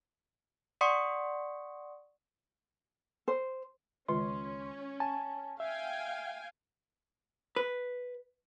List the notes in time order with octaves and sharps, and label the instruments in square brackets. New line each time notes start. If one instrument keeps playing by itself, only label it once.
[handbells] D5 F#5 C6 C#6 D#6 C#7
[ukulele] C5
[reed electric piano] C#2 C6 [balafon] D#3 G#3 F4 [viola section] C#4
[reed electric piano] G#5 A5
[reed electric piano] E5 [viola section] F5 G5 G#5
[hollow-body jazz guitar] B4